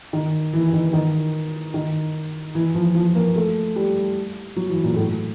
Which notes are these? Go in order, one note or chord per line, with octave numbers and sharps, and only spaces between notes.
D#3
E3
D#3
D#3
D#3
E3
F3
F3
A#3
A3
G3
F#3
E3
A#2
A2